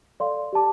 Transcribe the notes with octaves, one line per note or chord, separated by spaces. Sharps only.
A4 D5 F5 C6
G4 D5 A5 D6